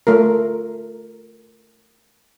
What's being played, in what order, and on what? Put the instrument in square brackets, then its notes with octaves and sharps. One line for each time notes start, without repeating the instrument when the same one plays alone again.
[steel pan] A3 F4 A#4